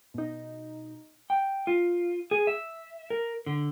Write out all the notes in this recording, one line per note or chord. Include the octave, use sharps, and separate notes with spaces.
B2 D#4
G5
F4
G#4
E5
A#4
D3